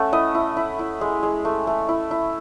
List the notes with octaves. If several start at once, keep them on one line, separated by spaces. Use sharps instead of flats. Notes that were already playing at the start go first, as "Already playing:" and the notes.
Already playing: A3 C#4 F#5
E4 D#5
E4
E4
E4
G#3
G#3
A3
A3
E4
E4